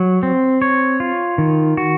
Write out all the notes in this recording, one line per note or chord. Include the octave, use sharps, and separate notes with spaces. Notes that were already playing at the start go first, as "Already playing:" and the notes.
Already playing: F#3
C4
C#5
F4
D#3
F#4